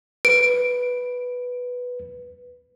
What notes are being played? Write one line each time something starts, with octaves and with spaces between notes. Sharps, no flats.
B4 D7